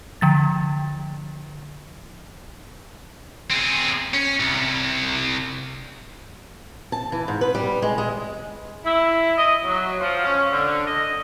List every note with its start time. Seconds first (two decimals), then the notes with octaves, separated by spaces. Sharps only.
0.21 D3 F3 A6
3.51 C4 G#4
4.14 C#4
4.40 C2
6.92 A5
7.12 E3
7.28 G#2
7.41 B4
7.55 G3
7.82 G#3
7.98 G#3
8.85 E4
9.36 D#5
9.64 F#3
10.00 F3
10.23 C#4
10.50 D3
10.86 D#5